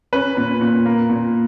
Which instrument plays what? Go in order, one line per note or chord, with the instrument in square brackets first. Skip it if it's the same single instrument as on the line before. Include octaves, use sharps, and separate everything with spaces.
[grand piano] C#4 B4
A#2
A#2
A#3
A#2